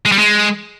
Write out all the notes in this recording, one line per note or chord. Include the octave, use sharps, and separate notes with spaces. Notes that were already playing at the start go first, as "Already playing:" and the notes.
G#3
G3
G#3